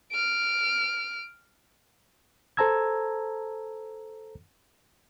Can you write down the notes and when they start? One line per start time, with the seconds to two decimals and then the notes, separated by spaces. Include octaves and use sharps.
0.12 F6 D7
2.57 A4 C5 A5 A#5 E6 G#6